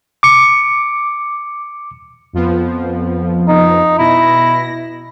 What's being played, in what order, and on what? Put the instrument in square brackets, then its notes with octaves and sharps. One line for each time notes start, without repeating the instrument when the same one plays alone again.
[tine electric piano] D6 C#7
[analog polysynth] F2 F3 B3
[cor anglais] D#4
[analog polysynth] B2 A#6 [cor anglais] E4